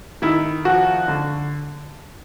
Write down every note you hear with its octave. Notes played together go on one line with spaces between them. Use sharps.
D#3 E4
F3 F#4
D3